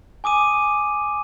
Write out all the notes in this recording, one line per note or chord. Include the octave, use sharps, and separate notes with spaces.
G#5 D6 D#6 D#7